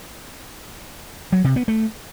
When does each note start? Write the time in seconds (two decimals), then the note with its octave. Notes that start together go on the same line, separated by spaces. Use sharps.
1.32 F#3
1.44 C3
1.56 B3
1.68 A3